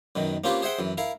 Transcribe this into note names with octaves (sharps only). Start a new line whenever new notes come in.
F#2 B2 D#3
A#3 C4 C#4 F4 G4 B4
G#4 C5 E5 F#5 G5
F#2 E3
E4 A#4 F5